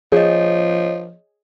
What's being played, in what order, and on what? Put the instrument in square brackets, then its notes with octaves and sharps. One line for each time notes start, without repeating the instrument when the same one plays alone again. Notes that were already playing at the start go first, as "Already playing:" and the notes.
[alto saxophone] F3 [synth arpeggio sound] G#4 [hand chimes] C#5 D#5